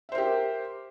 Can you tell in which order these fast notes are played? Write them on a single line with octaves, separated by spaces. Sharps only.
E5 C5 A#4 G4